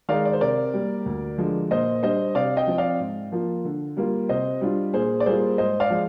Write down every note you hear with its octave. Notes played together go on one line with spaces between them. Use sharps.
D#3 G#3 D#4 D5 F5
D5
C5
C3 A#4 D5
G3 A#3
D2
D3 F3 G#3
A#2 C5 D#5
G3 D4 C5 D#5
C3 D5 F5
D#5 G5
F3 C4
D5 F5
G#2
F3 A#3 F4
D3
G3 A#3 F4
C3 C5 D#5
G3 D4 F4
A#2 G#4 C5
D5
G3 A#3 F4 G#4 C5
G#2 C5 D#5
D5 F5
F3 G#3